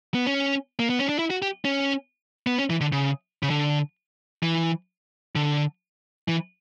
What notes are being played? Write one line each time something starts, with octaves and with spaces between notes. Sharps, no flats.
B3
C#4
A#3
B3
C#4
D4
E4
F#4
G4
C#4
B3
C#4
E3
D3
C#3
C#3
D3
E3
D3
E3